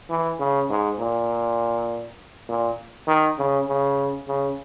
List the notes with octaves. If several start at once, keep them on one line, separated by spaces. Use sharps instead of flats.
E3
C#3
G#2
A#2
A#2
D#3
C#3
C#3
C#3